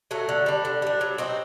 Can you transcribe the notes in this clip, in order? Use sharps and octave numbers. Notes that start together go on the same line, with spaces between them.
F#3 A3
D3
G3 D4
D3
G3 D4
F#3
C4 D#4 F#4